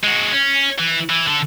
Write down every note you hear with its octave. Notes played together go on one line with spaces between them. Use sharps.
G#3 F#4
C#4
E3
E3
D3 A4